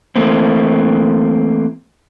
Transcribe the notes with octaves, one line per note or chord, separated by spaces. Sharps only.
E3 A3 A#3 C4